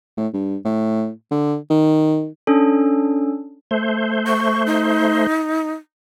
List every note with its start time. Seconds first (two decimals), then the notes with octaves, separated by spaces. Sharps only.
0.17 A2
0.33 G2
0.65 A2
1.31 D3
1.70 D#3
2.47 C#4 D4 A4
3.71 A3 C5
4.27 C#6
4.66 D#4